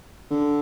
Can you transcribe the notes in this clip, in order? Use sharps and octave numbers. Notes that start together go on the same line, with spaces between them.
D3